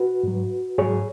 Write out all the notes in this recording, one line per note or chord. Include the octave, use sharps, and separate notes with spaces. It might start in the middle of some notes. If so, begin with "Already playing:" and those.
Already playing: F#4 B4
G#2 F#3
G#2 F#3 G#4 C#5